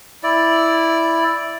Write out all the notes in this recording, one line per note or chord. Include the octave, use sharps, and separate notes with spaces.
E4 D5